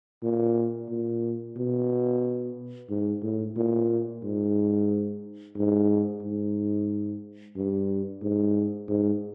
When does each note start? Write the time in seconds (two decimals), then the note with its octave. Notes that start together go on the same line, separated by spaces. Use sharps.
0.23 A#2
0.90 A#2
1.57 B2
2.89 G#2
3.23 A2
3.56 A#2
4.23 G#2
5.56 G#2
6.22 G#2
7.56 G2
8.22 G#2
8.88 G#2